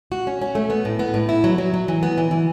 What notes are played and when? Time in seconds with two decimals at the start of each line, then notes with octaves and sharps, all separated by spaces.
0.12 F#4
0.27 C#4
0.41 C#4
0.55 A3
0.70 B3
0.85 A2
0.99 B3
1.14 A2
1.29 E4
1.44 F#3
1.58 F#3
1.74 F#3
1.88 E3
2.03 B3
2.18 E3
2.31 E3